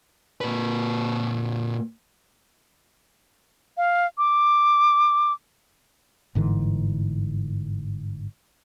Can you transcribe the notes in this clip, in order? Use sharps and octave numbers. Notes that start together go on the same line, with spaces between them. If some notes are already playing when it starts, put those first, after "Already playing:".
A#2 B4
F5
D6
G1 G#2 D3 E3